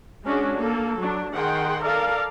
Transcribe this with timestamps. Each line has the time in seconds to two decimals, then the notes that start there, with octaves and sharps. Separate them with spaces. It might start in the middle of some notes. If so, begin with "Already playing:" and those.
0.24 G#3 C#4 D4 F#4 G#4
0.56 A#3 A4
0.99 F#3 D4
1.33 D#3 G#4 F#5 G5 C6
1.82 A4 A#4 D5 F5